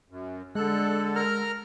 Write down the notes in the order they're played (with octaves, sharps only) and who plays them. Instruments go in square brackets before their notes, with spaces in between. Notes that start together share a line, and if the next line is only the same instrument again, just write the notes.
[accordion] F#2
[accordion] D3 A4 [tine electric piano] G#3 [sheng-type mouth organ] F#6
[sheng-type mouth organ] A#4 A#5 F6